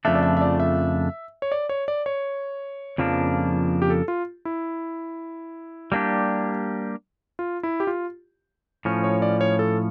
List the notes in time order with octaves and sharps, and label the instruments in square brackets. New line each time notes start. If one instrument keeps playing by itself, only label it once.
[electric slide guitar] F2 C#3 F3 A3 D4 [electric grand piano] E5
[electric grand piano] D5
E5
E5
D5
E5
C#5
D5
C#5
D5
C#5
[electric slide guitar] F2 C#3 F3 A#3 D4
[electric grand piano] G4
A4
F4
E4
[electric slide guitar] G3 A#3 D4 G4
[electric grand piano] F4
E4
G4
F4
[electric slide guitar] A2 F3 C#4
[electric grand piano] C#5
D5
C#5
A4